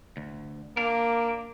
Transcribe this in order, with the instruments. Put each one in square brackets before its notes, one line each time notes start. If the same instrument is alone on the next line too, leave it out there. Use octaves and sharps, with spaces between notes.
[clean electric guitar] D2
[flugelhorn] A#3 [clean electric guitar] D4 A#4 [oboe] D6